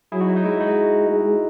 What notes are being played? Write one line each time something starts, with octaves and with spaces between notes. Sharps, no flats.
F#3 E4 G#4
D#4 F#4
E4
D#4
G#3 E4
D#4 F#4
G#3